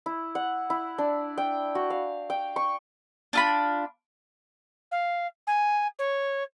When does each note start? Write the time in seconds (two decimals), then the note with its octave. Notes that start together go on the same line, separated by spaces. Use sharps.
0.06 E4
0.35 F#5
0.70 E4
0.98 D4
1.38 G5
1.75 F#4
1.90 F5
2.30 G5
2.56 C#6
3.33 D4 F4 B5
4.91 F5
5.47 G#5
5.99 C#5